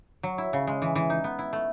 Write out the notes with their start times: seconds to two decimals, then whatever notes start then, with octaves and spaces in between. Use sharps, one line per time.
0.23 F#3
0.38 E4
0.53 C#3
0.67 G#3
0.82 E3
0.95 E3
1.10 D#4
1.24 B3
1.39 E4
1.53 A3